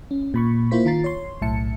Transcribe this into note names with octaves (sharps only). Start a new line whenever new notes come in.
C#4
A#2 B5 C#6
A#3 E4 F4 C5 B6
D#3 F4 A#5 A6 C7
C#5 C6
B1 A2 E5 A5 C#7